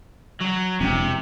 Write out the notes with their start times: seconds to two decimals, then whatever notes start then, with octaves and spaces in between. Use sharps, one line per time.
0.41 F#3
0.81 E1 C3